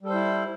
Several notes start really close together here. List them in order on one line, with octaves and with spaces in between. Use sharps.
G3 A4 C5 E4